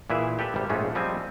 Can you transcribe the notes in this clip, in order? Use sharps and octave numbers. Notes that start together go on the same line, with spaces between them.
A#2 E3 E4 G#4 B4 E5
G4 A4 B4 E5
G#1 C3 G3
A#1 G#2 G#3 A3 C#4 F4
F3 G3 C4 D#4 G#5